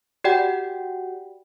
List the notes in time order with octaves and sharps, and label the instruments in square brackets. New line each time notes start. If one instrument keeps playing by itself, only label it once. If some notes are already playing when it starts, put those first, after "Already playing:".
[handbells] F#4 G4 D5 F#5 G5